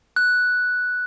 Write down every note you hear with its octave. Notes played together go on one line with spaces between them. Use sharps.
F#6